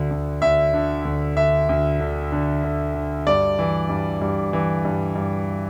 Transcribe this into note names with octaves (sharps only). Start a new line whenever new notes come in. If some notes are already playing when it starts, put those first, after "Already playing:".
Already playing: D2 D3
D2
D2 E5
D3
D2
D3 E5
D2
D3
D3
D3
D3
G2 D5
E3
G2
G2
E3
G2
G2